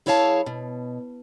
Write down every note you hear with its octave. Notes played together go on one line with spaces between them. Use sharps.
F#2 E4 G#4 C#5 F5 A5
B2